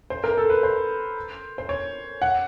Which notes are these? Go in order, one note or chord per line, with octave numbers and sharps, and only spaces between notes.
C5
A#4
A4
B4
C5
C5
C#5
F#5